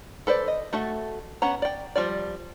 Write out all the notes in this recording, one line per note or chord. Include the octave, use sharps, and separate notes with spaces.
A4 B4 C5 D5
D#5
A3 F#4 A4 E5
B3 C#4 F#5 A#5
D5 G5
F3 G3 D5